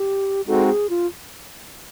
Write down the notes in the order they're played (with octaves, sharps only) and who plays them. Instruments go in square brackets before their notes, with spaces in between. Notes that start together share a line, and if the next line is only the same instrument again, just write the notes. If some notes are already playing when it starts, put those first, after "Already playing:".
Already playing: [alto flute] G4
[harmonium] G#3 C4 D#4 F#4 [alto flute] A4
[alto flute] G#4
F4